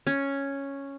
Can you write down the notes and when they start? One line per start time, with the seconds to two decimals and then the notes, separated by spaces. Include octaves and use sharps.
0.07 C#4